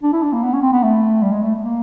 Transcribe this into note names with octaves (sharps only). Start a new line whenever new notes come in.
D4
E4
D4
A#3
B3
C#4
C4
B3
A3
G3
G#3
A3
A#3